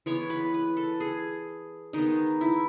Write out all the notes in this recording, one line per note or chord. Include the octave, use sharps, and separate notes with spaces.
E3 G#3 B3 C#5
B4
B4
A4
G#4
D#3 G#3 B3 D#4
E4